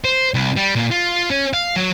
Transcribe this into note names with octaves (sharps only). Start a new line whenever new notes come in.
C5
C2
G3
A#2
F4
C#4
F5
F#3